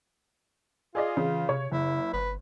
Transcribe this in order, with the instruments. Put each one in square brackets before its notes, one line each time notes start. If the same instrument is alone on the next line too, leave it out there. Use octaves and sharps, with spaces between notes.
[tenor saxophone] F4 [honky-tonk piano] G#4 D5 D#5
[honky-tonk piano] C#3 [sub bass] E3
[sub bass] C3 [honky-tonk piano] C#5
[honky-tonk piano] F#1 [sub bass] C#3 [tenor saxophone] E4
[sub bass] G1 [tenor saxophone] B4